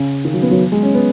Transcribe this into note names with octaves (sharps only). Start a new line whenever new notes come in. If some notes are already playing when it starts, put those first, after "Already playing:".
Already playing: C#3
D#3
F#3
B3
F#3
G#3
C#4
B3